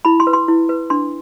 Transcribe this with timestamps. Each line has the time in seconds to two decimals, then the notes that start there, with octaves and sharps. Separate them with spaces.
0.05 E4 B5
0.20 C6
0.27 B4
0.33 C6
0.48 E4
0.69 B4
0.90 D4 C6